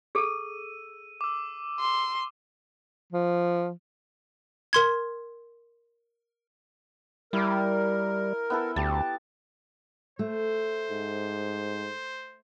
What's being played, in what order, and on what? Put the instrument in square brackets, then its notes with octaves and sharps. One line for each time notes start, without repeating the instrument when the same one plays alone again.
[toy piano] G#4 A4 [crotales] E6 D#7
[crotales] D6 E6
[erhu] C6
[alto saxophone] F3
[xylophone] A#4 C6 G#6
[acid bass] G3 [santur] E4 D6 [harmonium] A#4
[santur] B3 E4 A4
[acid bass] D2 [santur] G4 A5
[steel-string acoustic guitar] A3 [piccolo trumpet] C5
[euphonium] G#2